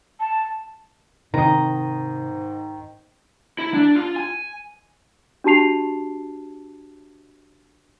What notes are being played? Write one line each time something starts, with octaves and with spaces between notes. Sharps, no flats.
A5
G#2 C3 D#3 D#5 A#5
E4
D4
F4
G#5
D4 F#4 G4 A5 C7 F7